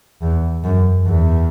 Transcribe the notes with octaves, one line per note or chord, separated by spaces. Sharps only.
E2
F#2
E2